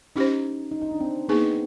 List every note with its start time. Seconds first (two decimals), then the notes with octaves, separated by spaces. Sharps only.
0.16 C#4 D#4 E4 G4 C5
0.71 D#4
0.82 D#4
0.91 D4
1.01 C4
1.29 A#3 B3 D#4 G#4